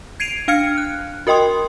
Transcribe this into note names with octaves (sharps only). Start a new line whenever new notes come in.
G#6 C7 D7 D#7 F7
D4 F5 F6 G#6 C#7
F#6
F#4 A#4 D#5 G5 C6 D#6